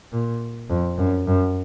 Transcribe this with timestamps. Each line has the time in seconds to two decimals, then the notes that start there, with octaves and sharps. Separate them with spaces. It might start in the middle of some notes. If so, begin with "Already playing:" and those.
0.12 A#2
0.70 F2
0.98 F#2
1.27 F#2